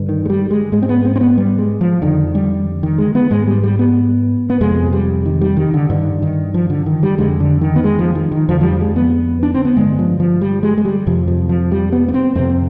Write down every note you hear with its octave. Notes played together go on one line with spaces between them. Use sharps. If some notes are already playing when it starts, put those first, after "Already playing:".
Already playing: G2 D3
D#3
G#3
G3
G#3
G#2 G#3
C4
B3
C4
C4
B3
G3
G#3
F3
F2 D3 D#3
G3
D#3
G#3
B3
G#2 G#3
G3
G3
B3
B3
F2 C3 G#3
G3
D#3
G3
D#3
D3
G2 D3 D#3
D#3
F3
D3
D#3
G3
F2 D3 G#3
D3
D#3
B3
G#3
F3
D#3
D#3
F2 D3 F3
F3
G3
G#3
B3
D4
C4
B3
G2 D3 G#3
F3
F3
G3
G#3
G#3
G3
F2 C3 F3
F3
F3
G3
B3
B3
C4
F2 C3 C4